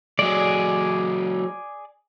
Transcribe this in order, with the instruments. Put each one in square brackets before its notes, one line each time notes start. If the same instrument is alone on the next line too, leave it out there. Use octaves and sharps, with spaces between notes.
[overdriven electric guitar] F#3 G#3 [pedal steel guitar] G#4 D5